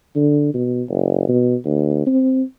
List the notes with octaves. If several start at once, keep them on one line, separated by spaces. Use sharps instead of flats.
D3
B2
F#1
B2
D2
C4